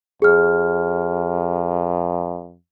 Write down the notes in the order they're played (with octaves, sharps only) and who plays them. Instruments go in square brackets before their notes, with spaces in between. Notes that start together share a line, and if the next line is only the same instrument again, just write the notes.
[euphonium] F2 [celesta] G#4 F6